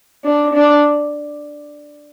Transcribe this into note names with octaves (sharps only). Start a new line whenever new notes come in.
D4
D4